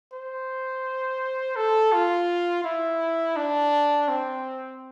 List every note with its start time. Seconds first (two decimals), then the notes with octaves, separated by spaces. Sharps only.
0.13 C5
1.56 A4
1.93 F4
2.64 E4
3.37 D4
4.08 C4